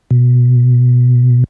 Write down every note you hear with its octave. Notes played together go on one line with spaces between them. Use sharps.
B2